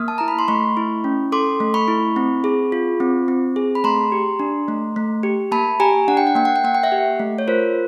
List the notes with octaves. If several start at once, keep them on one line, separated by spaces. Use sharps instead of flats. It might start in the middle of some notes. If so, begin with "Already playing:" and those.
Already playing: A#3 D#6 F6
A5
E4 A#5
B5
C6
A3 B5 C#6
E4
C#4
A4 C6 D6
A3
B5 C#6
E4
C4
G#4
F4
C4
C4
G#4
B5
A3 A#5 C6
G4
D4
A3
A3
G4
A#3 A5 B5
G4 G#5 A#5
D4 F#5
G5
F#5
A#3 G5
F#5
G5
A#3 F#5
G5
E5 F#5
G4
A3
C#5
F4 A#4 C5